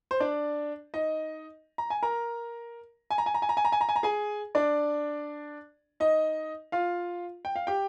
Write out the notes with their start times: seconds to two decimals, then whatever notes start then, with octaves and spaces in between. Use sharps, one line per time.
0.11 C5
0.20 D4 D5
0.94 D#4 D#5
1.78 A#5
1.90 G#5
2.03 A#4 A#5
3.10 G#5
3.18 A#5
3.26 G#5
3.34 A#5
3.42 G#5
3.49 A#5
3.57 G#5
3.65 A#5
3.72 G#5
3.81 A#5
3.89 G#5
3.96 A#5
4.03 G#4 G#5
4.55 D4 D5
6.00 D#4 D#5
6.72 F4 F5
7.45 G5
7.56 F5
7.67 G4 G5